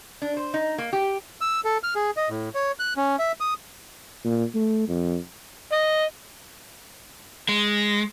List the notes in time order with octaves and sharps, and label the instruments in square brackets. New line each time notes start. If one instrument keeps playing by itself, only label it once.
[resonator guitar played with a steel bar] D4
C5
D#4
A#3
G4
[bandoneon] E6
A4
F6
G#4
D#5
A2
C#5
F#6
C#4
E5
D#6
[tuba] A#2
A3
F2
[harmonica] D#5
[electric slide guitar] G#3